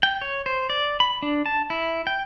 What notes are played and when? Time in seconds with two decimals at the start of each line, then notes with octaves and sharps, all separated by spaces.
0.03 G5
0.22 C#5
0.46 C5
0.70 D5
1.00 B5
1.22 D4
1.46 A5
1.70 E4
2.07 G5